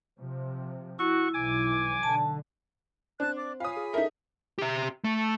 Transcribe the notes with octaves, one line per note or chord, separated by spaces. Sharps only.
C3 F3
E4 F#4 C#6
B1 E3 G#5 D6
B1 D3 A5
C4 D4 C5 A5 F#6
D5 D6
F4 C#5 F5 G#5 B5 D#6
G#4
D#4 A4 A#4 E5
G4 E5
A3